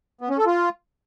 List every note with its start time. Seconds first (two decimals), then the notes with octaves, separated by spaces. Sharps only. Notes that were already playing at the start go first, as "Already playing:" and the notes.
0.21 B3
0.29 C#4
0.38 A4
0.46 F4